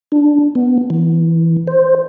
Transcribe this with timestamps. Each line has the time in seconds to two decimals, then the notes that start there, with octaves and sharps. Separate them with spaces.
0.12 D4
0.55 B3
0.90 E3
1.67 C5